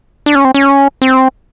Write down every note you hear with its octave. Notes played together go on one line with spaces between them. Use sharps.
D4
C#4
C4
C#4
C4